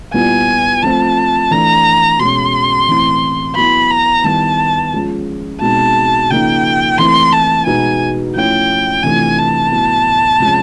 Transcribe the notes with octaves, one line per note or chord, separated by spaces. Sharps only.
A#2 G3 B3 E4 G#5
F3 A3 C4 F4 A5
E3 A3 D4 A#5
B2 G#3 C#4 C6
A2 E3 A3 C4 E4
F#3 B3 E4 B5
A#5
D#3 G3 B3 E4 A5
F3 G#3 C#4 F4
B2 G#3 C4 D#4 A5
C#3 F3 A#3 D#4 G5
E3 A3 C4 E4 C6
A5
B2 G#3 B3 D#4 G#5
F3 A3 C#4 E4 G5
C3 E3 A3 D4 F4 G#5
A5
A2 F#3 B3 E4
C3 F3 G#3 C#4